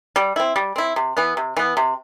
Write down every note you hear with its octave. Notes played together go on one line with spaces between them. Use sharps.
G3
C4 E4
G3
C4 E4
C3
E3 B3
C3
E3 B3
C3